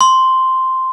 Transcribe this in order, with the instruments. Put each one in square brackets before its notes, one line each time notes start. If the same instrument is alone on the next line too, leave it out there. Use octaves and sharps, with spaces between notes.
[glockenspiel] C6